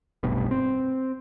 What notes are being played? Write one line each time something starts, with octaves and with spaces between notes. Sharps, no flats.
F1 B1 G2 B2
C4